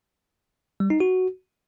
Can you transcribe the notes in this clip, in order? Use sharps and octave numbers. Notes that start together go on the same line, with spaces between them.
G3
D#4
F#4